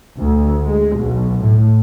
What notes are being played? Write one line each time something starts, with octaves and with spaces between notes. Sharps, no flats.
D2
G#3
B1
A2